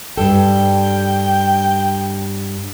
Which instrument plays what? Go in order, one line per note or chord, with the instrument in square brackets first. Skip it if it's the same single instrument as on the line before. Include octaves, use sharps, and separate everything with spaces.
[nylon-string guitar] G2 G3 A4 [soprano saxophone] G5